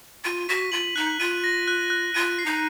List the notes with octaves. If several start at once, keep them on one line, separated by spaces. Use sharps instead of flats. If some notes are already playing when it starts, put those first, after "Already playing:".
F4 D#7
F#4 B6
F4 F#7
D#4 F#6
F4 D#7
A#6
F#6
F#6
F4 D#7
C7
D#4